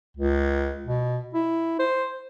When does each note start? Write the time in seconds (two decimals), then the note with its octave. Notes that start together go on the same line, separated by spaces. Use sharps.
0.17 C#2
0.86 B2
1.34 E4
1.79 C5